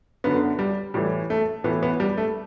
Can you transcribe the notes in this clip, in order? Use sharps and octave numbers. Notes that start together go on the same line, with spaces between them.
F#2 D3 B3
G3
A2 E3 G3
A3
A2 E3 B3
B3
G3
A3